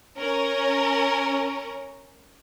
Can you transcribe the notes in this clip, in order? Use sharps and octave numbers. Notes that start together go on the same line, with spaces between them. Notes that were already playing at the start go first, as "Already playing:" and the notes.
C#4 A#4